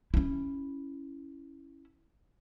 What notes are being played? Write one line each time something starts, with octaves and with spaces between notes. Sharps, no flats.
C#4 E4